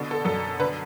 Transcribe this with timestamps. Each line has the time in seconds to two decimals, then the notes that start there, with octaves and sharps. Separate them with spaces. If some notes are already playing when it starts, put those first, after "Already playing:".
Already playing: B2 D3
0.11 A4
0.25 F#2 A4
0.59 D3 B4